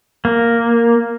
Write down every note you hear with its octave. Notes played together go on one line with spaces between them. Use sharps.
A#3